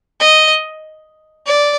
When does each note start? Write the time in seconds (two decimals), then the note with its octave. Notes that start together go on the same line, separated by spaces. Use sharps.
0.20 D#5
1.46 D5